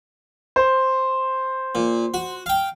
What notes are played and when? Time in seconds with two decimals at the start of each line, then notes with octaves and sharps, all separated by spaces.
0.56 C5
1.75 A#2
2.14 F#4
2.46 F5 G5